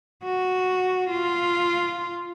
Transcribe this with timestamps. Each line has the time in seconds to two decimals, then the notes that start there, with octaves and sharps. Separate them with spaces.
0.24 F#4
1.10 F4